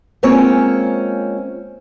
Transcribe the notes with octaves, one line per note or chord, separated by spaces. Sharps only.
G#3 A#3 C4 C#4 F4 C#5